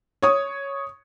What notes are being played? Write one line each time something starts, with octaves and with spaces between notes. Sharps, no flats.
C#5 D#6